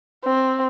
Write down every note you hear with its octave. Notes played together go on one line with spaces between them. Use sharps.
C4